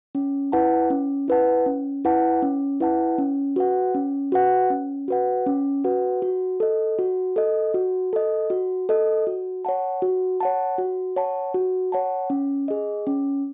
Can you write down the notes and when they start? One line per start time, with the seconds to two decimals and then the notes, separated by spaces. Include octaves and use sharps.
0.15 C#4
0.52 E4 B4 F#5 A5
0.90 C#4
1.28 E4 B4 F#5 A5
1.66 C#4
2.05 E4 B4 F#5 A5
2.42 C#4
2.80 E4 B4 F#5 A5
3.18 C#4
3.56 F#4 B4 F#5
3.95 C#4
4.32 F#4 B4 F#5
4.70 C#4
5.08 F#4 B4 F#5
5.46 C#4
5.84 F#4 B4 F#5
6.22 F#4
6.60 A4 D#5
6.99 F#4
7.36 A4 D#5
7.74 F#4
8.13 A4 D#5
8.50 F#4
8.89 A4 D#5
9.27 F#4
9.65 C#5 F#5 A5
10.02 F#4
10.40 C#5 F#5 A5
10.78 F#4
11.16 C#5 F#5 A5
11.54 F#4
11.92 C#5 F#5 A5
12.30 C#4
12.68 G#4 D#5
13.07 C#4